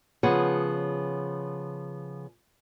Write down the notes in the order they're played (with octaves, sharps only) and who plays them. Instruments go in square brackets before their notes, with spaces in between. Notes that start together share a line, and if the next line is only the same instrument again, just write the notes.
[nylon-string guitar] C#3 F3 B3 G#4 C#5 F#5